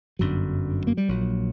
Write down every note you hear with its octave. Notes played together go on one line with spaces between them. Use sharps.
G1 F#2 D3 F#3
A#3
G3
A#1 A#2 F#3